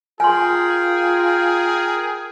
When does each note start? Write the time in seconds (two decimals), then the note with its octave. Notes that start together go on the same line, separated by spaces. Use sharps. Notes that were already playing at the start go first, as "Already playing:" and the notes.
0.20 F4 G#4 A#4 G5 G#5 C6